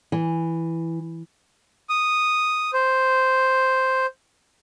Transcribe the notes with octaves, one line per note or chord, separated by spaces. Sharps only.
E3
D#6
C5